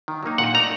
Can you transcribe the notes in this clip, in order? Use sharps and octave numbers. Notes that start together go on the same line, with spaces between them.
D#3
F#3 A#3 D#4
A#2 F#5
A3 D#4 A#5